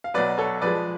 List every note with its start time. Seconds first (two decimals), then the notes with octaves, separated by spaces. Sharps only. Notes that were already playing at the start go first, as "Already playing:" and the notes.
0.04 F5
0.14 B1 B2 F#3 B4 D5
0.38 A4 C#5
0.62 F2 F3 G#3 B4 D5